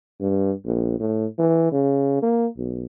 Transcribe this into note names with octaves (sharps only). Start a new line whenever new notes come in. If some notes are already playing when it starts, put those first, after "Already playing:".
G2
A#1
A2
E3
C#3
A#3
B1